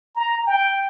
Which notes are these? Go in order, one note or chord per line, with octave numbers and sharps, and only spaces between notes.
A#5
G5